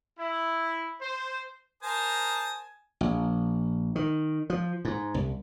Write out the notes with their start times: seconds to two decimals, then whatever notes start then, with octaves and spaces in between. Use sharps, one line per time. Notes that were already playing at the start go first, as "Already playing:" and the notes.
0.19 E4
1.01 C5
1.83 A#4 C5 G#5 A5 D#6
3.01 A#1
3.96 D#3
4.50 F3
4.85 G#2
5.14 C2